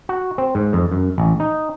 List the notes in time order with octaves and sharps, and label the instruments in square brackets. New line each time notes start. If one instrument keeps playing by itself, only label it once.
[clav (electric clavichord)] F#4
C4
G#2
F2
F#2
A1
D#4